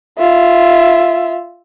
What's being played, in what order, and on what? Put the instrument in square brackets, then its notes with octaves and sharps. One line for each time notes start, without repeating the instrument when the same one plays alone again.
[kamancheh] F4 E5